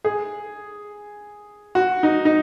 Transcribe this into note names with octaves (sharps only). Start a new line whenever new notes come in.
G#4
F#4
D#4
D#4